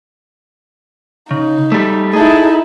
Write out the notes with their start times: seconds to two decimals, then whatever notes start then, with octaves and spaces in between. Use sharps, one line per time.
1.31 C#3 D#4
1.72 G3 A3
2.13 D#4 E4 G#4 A4